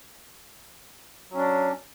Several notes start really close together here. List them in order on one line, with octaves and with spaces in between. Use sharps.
F#3 C#4 D4